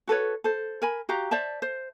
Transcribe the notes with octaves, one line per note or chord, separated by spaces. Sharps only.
F#4 A4 B4 C#5
A4 C5
A#4 G#5 B5
F#4 G4 F5 A#5
C5 D5 E5 A5
C5